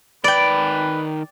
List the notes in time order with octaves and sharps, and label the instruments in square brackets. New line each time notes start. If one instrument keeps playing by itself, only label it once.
[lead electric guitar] D#3 B5 [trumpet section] B4 [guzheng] D5 G5